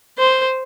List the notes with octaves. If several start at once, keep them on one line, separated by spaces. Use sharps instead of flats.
C5